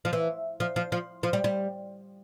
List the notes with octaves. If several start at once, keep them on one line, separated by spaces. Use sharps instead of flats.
F3
E3
F3
F3
F3
F3
G3
G3